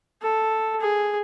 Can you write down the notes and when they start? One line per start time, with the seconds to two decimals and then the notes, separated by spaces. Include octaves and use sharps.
0.21 A4
0.80 G#4